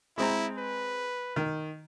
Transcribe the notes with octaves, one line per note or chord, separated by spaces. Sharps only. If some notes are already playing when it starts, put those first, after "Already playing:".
G#3 C4 E4 A#5
B4
D#3